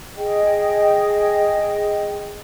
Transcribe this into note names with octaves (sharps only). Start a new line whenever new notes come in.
G#4 D#5 G5